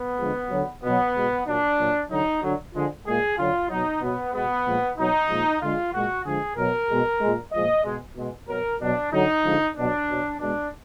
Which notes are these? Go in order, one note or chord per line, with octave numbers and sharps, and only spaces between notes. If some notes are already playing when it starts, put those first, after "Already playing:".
Already playing: B3
D3 F3 G#3
D3 F#3
B2 F#3 B3
B2 G#3
A#2 F#3 D4
A#2 F#3
D3 F#3 D#4
D3 F#3
D3 F3 G#3
A#2 G#3 G#4
D3 F#3 F4
B2 F#3 D#4
B2 F#3 B3
B2 G#3 B3
A#2 F3 G#3
B2 F#3 D#4
A#2 F3 G#3
D3 G#3 F4
A#2 G#3 F#4
D3 F3 G#3 G#4
B2 F#3 A#4
B2 G#3
A#2 G#3
A#2 F3 G#3 D#5
B2 G#3
B2 G#3
B2 F#3 A#4
B2 F#3 D4
D3 F#3 D#4
D3 F3 G#3
B2 F#3 D4
B2 F#3
B2 G#3 D4